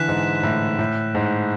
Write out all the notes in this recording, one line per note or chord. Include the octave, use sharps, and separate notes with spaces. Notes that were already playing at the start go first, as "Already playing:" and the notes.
Already playing: D3 E3 F#6 B6 E7
G#2
A2
A2
G#2